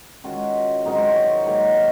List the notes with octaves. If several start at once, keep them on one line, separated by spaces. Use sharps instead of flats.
D#3 G#3 C#4 F4 F#4
G#2 F#3 C4 D#4 A#4
C5
C5
C#5
G#2 D#3 F#3 A#3
F5